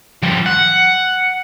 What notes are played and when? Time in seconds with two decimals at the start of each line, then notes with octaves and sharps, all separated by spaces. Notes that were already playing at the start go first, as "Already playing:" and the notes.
0.23 F3 G3
0.46 F#5